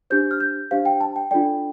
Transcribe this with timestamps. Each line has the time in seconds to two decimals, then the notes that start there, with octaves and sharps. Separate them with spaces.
0.10 D4 G4 C5 G6
0.31 F6
0.40 G6
0.71 D4 G4 C5 F5
0.86 G5
1.01 A5
1.16 G5
1.31 D4 F4 A4 D5 G5